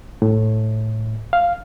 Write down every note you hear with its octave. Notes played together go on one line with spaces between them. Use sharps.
A2
F5